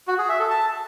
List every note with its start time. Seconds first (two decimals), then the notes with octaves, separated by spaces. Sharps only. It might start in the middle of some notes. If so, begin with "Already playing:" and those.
0.08 F#4
0.18 G#4
0.29 E5
0.40 A4
0.50 A5